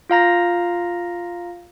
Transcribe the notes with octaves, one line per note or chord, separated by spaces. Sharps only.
F4 F5 A#5 A#6